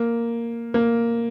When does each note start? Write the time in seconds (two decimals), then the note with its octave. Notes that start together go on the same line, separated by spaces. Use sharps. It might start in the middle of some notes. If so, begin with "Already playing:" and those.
Already playing: A#3
0.74 A#3